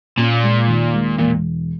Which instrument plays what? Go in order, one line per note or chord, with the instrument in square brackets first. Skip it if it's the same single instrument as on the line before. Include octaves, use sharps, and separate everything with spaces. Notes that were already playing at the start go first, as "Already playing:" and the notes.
[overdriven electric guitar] A#2 [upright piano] C#4
[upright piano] G#3
D#2
G#3
[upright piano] E1 [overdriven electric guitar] A#2